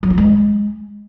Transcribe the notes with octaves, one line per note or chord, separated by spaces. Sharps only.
F#3
F4
G#3